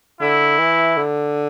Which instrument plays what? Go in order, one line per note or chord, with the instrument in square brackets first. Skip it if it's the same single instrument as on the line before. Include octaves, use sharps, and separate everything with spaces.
[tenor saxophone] D3 [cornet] E4
[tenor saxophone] E3
D3